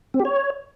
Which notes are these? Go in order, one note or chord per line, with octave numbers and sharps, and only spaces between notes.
C4
G4
C#5